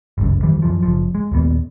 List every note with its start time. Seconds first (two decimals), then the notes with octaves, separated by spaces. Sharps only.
0.18 G1 C#2 F#2
0.42 F2 D#3 E3 G3
0.62 F#2 E3 F3
0.83 F#1 C2 F3
1.15 G#3
1.32 D#2 A#2 B3